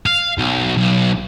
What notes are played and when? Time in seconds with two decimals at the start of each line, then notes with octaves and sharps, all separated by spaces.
0.06 F5
0.38 B1
0.78 B1